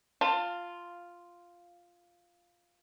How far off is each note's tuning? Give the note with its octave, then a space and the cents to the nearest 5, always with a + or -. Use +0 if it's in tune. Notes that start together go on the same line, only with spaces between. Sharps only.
F4 +0 A5 +20